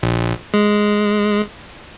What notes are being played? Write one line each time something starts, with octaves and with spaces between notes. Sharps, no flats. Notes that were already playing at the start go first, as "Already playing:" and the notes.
A#1
G#3